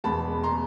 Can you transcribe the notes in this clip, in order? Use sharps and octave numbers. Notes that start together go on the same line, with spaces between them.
E2 B2 G#3 A5 B5
A#5 C6